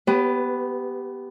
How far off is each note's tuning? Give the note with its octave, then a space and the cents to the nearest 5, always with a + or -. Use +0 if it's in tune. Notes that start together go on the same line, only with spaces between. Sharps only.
B3 +0 G4 +0 B4 +30